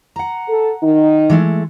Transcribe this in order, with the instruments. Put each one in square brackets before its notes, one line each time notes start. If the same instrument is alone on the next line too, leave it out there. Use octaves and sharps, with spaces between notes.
[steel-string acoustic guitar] F#5 A#5
[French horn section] A4
D#3 D#4
[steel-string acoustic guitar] E3 G#3 A3